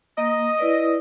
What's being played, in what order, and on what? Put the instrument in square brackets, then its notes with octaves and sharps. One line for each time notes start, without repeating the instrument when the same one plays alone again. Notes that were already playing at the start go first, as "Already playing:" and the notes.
[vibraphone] A#3 [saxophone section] D#5
[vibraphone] E4 B4 D5